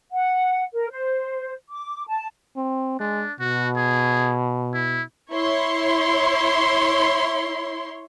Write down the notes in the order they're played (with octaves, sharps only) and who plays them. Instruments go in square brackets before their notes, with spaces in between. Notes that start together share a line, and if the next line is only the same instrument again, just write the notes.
[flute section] F#5
A#4
C5
D6
A5
[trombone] C4
[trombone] G#3 [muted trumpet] D4
[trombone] B2 [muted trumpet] F#4
[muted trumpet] G#4
E4
[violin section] E4 C#5 C6